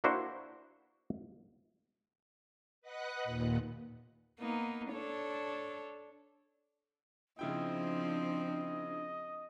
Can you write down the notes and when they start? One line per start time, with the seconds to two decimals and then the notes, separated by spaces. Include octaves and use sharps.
0.04 A#3 D4 E4 F#4 C5
2.82 B4 D#5 F#5 F#6
3.24 D#2 A#2
4.39 A#3 B3 D#4
4.92 D4 A4 C#5
7.39 C#3 F3 C4 D4 E4 D#5 G5